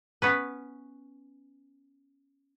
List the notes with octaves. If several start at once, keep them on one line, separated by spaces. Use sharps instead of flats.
B3 C#4 B4